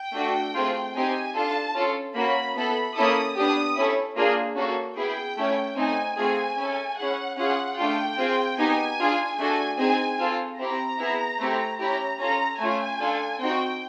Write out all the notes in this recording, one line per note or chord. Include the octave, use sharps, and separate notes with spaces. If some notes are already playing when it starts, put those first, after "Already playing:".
Already playing: G5
A3 D4 F#4 A4
A3 C4 F4 G#4
C4 D#4 G4 G#5
D4 F4 A4 A5
C#4 F4 A4
A#3 C#4 F#4 B5
B3 E4 A4 B5
A#3 C#4 E4 A4 D#6
B3 D4 G4 D#6
C#4 E4 A4
A#3 D4 F4 G#4
A#3 C#4 F#4 A4
B3 E4 G#4 G5
A3 C#4 E4
A3 C4 D#4 G#5
A3 C4 F4 G#4 G#5
C#4 E4 A4
C#4 E4 G#4 F#5
C#4 F4 G#4 F#5
A3 D4 F4 G5
C4 F4 G#4
B3 D#4 G4 G#5
D4 F4 G#4
A3 D4 F#4 A4 G#5
C4 D#4 G#4 G#5
C4 F4 A4
C4 E4 G4 A#5
B3 E4 G#4
A3 C4 E4 G4
C#4 E4 G4 A#5
C#4 F4 A4 A#5
A3 C#4 F4 G#5
D4 F4 A4
C4 D#4 F#4 G5